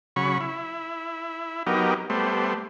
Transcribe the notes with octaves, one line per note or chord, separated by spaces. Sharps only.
C#3 F#3 B5 C#6
E4
F#3 B3 D#4 G4 A#4
G3 A3 B3 C5